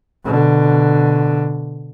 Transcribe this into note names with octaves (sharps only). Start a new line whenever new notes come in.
B2 D3